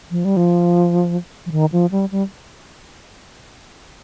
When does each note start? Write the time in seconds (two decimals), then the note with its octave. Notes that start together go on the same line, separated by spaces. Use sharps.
0.11 F3
0.25 G3
0.37 F3
1.46 F3
1.51 D#3
1.72 F3
1.91 G3
2.12 G3